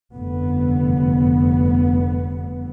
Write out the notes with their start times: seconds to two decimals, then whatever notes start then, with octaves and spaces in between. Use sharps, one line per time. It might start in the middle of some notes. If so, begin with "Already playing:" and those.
0.14 F1 G2 D3 B3